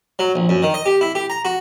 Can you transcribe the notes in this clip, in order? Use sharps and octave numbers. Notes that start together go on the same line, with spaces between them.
F#3
A#1
F#2
D#3
D#5
G4
E4
G4
A#5
F#4